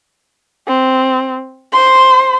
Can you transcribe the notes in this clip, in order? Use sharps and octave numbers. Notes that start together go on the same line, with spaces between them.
C4
C5 C6